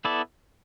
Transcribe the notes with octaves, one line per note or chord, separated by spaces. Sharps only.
B3 E4 A4 D5